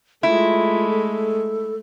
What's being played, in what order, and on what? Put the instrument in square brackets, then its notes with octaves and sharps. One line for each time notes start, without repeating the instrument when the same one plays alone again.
[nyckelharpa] G#3 A3 [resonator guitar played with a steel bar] E4 [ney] F4
[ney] A4